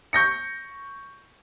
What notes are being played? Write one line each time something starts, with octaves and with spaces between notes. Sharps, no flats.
C#6 G6 A#6 C#7